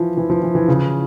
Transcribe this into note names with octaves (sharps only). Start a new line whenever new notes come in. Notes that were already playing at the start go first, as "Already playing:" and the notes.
Already playing: E3 F3
E3
F3
E3
E3
C#3